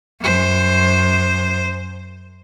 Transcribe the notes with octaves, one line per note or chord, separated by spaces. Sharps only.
F#2 C5